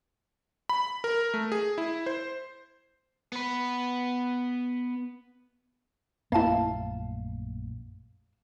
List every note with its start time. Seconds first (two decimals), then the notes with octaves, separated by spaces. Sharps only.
0.69 B5
1.04 A#4
1.34 A3
1.52 G#4
1.78 E4
2.06 C5
3.32 B3 B4
6.32 A#1 F#2 A3 A#3 E4 F5 A5